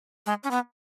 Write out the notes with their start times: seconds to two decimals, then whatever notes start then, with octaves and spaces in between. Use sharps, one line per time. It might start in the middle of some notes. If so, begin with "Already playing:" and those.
0.26 G#3
0.44 C#4
0.51 B3